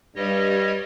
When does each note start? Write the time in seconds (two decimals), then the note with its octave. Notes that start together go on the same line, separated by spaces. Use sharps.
0.15 G2 G3 C#5 D#5